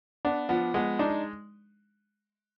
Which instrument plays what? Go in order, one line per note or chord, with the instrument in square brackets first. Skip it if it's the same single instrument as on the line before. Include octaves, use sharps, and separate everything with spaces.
[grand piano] B3 [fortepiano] D4
[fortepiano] F3 [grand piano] B3
[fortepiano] G#3 [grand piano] B3
[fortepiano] D4 [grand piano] D#4